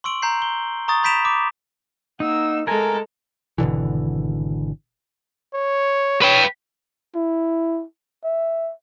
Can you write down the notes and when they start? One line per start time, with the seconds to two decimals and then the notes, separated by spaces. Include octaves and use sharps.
0.04 C6 C#6 E6 D7 F#7
0.22 A#5 G6 C7
0.42 G7
0.88 A#5 C#6 D#6 A6
1.03 B5 G6 B6 D7 E7 F7
1.25 D6
2.20 A#3 D#4 F#5 E6
2.67 G#3 A3 A4 A#4 G#5 A#5
3.58 G#1 B2 D3 E3
5.54 C#5
6.22 B4 C#5 G5
7.15 E4
8.24 E5